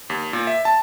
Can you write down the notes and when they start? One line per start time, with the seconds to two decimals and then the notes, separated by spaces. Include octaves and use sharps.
0.10 D#2
0.33 A#2
0.47 E5
0.65 A5